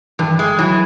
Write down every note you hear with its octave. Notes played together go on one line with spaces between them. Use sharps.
G2 E3
G#3
E3 F#3